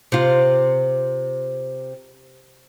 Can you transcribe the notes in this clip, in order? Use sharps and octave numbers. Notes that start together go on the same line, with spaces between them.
C3 F4